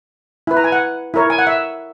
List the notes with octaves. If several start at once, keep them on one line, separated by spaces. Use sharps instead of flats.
E4 B4
A#5
G#5
F#5
E4 A#4 C#5
G#5
F#5
E5